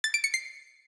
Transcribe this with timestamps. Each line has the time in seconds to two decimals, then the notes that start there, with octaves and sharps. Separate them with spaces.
0.04 A6
0.14 D7
0.24 C#7
0.34 C7